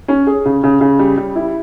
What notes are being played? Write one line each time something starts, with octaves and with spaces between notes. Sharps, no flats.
C#4
G#4
C#3
C#3
C#3
G3
G3
E4